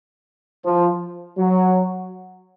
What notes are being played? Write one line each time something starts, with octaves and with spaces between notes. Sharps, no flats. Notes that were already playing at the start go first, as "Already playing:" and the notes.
F3
F#3